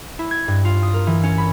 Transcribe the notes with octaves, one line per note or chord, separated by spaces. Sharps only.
E4
G#6
G2
F4
D#6
A#4
E3
C#4
B5